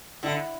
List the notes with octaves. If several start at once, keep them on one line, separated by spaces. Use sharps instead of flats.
D3 E4